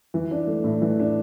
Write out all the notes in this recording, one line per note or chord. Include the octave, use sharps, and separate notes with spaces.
E3
D4
A3
A2
E3
D4